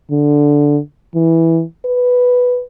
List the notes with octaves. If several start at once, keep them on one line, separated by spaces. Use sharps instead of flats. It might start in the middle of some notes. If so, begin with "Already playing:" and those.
D3
E3
B4